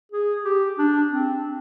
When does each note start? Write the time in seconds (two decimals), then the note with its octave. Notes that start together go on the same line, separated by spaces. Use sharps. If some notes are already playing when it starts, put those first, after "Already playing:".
0.12 G#4
0.45 G4
0.78 D4
1.12 C4